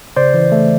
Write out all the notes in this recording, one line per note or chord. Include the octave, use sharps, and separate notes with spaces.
C#3 C5 D5
E3
A3